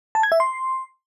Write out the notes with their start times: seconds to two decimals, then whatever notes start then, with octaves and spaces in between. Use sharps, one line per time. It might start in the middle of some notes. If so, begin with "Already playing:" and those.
0.15 A5
0.23 G#6
0.32 E5
0.40 C6